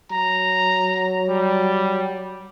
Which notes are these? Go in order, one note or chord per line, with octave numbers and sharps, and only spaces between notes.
F#3 A#5
G3